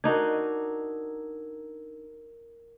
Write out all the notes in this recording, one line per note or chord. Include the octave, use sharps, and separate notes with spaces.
D4 D#4 F#4 A#4 G#6